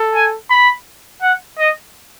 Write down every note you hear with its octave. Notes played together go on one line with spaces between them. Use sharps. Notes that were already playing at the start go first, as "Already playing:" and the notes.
Already playing: A4
G#5
B5
F#5
D#5